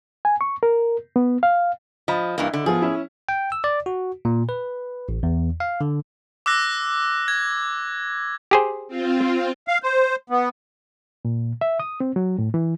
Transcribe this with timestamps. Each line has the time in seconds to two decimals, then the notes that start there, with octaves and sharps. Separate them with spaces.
0.25 G#5
0.41 C#6
0.63 A#4
1.16 B3
1.43 F5
2.08 F3 D#5 B5
2.38 G2 E3 A#3
2.53 D3
2.66 F3 B3 F4 G#4
2.82 C#4 E4
3.29 G5
3.52 E6
3.64 D5
3.86 F#4
4.25 A#2
4.49 B4
5.09 A1
5.23 E2
5.60 F5
5.81 D3
6.46 D6 E6 F#6 A#6
7.28 G#6
8.51 G4 G#4 C5
8.88 C4 F4
9.68 F5
9.83 C5
10.30 B3
11.25 A#2
11.61 E5
11.80 D#6
12.00 C4
12.16 F#3
12.38 A2
12.54 E3